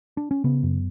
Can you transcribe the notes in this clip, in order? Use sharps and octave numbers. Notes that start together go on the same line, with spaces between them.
D4
C#4
C#3 B3
F#2